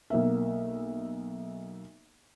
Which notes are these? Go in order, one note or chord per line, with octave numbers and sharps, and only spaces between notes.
B1 A#3 E5